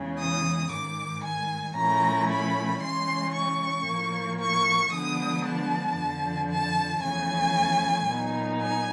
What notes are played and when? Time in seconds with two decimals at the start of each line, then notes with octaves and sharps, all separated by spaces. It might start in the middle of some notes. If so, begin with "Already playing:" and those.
Already playing: E2 C#3 E3 G#3
0.19 D#6
0.71 G#2 D#3 G#3 D6
1.24 G#5
1.76 A#2 F3 A3 C#4 E4 A#5
2.29 B5
2.81 C#3 E3 G#3 C#4 C6
3.33 C#6
3.86 A2 F3 A#3
4.39 C#6
4.92 D3 F3 G#3 B3 D4 D#6
5.45 A5
5.96 F2 D3 F3
6.50 A5
7.02 E2 C#3 F3 A3 G#5
8.06 A#2 F#3 B3 D#4
8.59 G#5